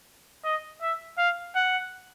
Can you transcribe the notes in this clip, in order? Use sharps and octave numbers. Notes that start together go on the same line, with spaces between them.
D#5
E5
F5
F#5